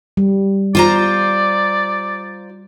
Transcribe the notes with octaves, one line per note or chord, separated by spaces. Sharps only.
G3
F4 C5 D5 A#5